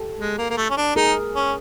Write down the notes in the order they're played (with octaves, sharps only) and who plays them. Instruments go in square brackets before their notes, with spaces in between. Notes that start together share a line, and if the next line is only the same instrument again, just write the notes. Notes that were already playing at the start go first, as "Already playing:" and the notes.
Already playing: [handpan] G4 A4
[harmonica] G#3
A#3
A#3
A3
C#4
D4
[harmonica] D#4 [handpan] G#4 A#4
[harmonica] C#4